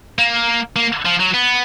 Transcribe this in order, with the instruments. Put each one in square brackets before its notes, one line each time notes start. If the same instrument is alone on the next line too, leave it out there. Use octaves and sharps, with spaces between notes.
[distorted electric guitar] A#3
A#3
F3
F#3
B3